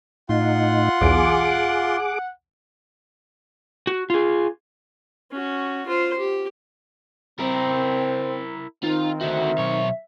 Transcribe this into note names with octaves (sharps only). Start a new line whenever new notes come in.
A2 D#4 F4 F#5 C6
B1 E2 G#4 D6
F#4
F4 G#4
C#4 F#4
F4 C5
G4
C4 E4 A#4
D#3 C4 D#4 F4
D3 F#4 E5
B1 C#5